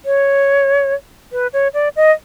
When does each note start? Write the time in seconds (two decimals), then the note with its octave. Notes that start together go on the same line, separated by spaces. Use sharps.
0.05 C#5
1.32 B4
1.53 C#5
1.74 D5
1.96 D#5